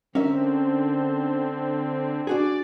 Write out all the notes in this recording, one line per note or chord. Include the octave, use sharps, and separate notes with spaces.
D3 C4 C#4 A#4 E5
D4 F#4 G#4 D5